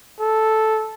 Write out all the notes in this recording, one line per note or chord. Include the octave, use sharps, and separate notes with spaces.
A4